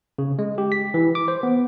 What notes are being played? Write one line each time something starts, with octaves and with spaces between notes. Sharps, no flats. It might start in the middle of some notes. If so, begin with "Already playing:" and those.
C#3
G#3
G4
B6
E3
D6
C5
B3